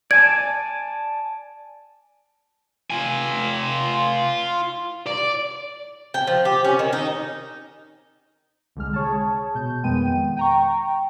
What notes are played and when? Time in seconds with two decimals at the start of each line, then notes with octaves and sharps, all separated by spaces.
0.11 D5 G#5 A5 G#6
2.90 F4 G#5
5.07 D5
6.14 G5
6.27 F3
6.45 G4
6.64 C#4
6.79 D#3
6.93 D#4
8.76 C2 D3 G#3 F6
8.93 G#4 C#5 A5
9.55 B2 G6
9.83 F2 D#3 G#3 B3 G5 D#7
10.37 G5 A#5 C#6